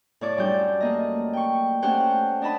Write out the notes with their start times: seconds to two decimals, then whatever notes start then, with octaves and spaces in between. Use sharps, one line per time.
0.21 A2 E4 C#5 D5 D6
0.37 F#2 G3 D4 F4 G6
0.81 A3 A#3 D#5
1.33 G5 C#6
1.82 A3 C#4 G4 C5 F#5 G5
2.42 D4 D#5 A5 B5